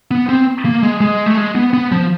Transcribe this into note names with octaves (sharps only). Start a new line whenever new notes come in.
B3
C4
A#3
G#3
G#3
A3
G#3
B3
B3
F3